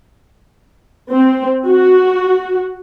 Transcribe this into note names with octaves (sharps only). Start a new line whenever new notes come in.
C4
F#4